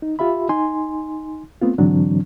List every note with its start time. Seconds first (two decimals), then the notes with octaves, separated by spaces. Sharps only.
0.02 D#4
0.19 F4 G4 E5 B5
0.49 D#4 G#5 C6
1.61 A3 B3 C4 F4
1.78 G#2 D3 E3 F#3 C4 D4